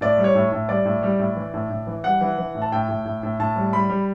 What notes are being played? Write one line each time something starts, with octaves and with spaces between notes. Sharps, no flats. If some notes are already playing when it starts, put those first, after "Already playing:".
A2 D5
G3
C#5
A2
A2
G3 D5
A2
G3
A2
E3
A2
A2
E3
G3 F#5
E3
E3
A2
A5
A2 G5
A2
A2
A2
A2 A5
G3
G3 B5
G3